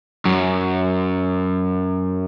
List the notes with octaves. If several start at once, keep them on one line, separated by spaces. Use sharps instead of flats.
F#2